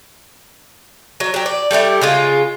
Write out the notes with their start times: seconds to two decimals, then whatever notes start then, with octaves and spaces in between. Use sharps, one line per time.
1.20 F#3
1.34 F#3 G4
1.46 D5
1.71 G3 A3 E4 G4
2.01 C#3 G#3 F4